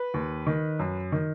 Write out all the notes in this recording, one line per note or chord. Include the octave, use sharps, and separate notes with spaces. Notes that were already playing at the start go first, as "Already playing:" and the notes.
Already playing: B4
D#2
D#3
F#2
D#3